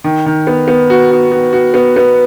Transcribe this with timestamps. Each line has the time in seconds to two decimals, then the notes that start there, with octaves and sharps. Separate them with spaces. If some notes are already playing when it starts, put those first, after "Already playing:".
0.04 D#3
0.26 D#3
0.47 B3
0.68 B3
0.90 F#4
1.10 F#4
1.32 F#4
1.53 F#4
1.74 B3
1.96 B3